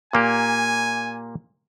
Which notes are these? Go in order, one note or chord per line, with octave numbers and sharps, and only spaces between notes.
A#2 A#3 G4 G#5